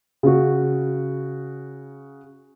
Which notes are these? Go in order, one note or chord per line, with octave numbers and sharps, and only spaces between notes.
C#3 F#4